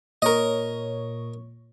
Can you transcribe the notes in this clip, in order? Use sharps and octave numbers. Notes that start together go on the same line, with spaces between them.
A#2 A#4 C#5 D#5